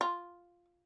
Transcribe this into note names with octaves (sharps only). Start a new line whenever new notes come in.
F4